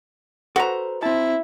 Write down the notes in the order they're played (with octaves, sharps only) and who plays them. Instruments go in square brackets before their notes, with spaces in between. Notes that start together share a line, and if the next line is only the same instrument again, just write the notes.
[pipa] F#4 A#5 [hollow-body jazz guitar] A4 B4 C5
[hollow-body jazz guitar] C4 A5 [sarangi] E4